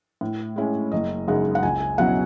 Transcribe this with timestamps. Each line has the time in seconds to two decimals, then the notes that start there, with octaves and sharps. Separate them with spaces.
0.21 A2
0.56 G#3 C#4 E4
0.92 F#1 D#5
1.28 F#2 C#3 G#3 D#4 F#5
1.55 F#5
1.63 C#2 G#5
1.80 G#5
1.98 B2 F#3 C#4 E4 F#5